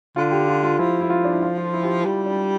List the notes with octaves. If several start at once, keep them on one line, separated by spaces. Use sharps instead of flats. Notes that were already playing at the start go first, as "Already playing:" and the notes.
D3 F4
G4
F4
F4
F3 E4
E4
F4
D4
E4
F4
F4
E4
G4
F4
G3 E4
D4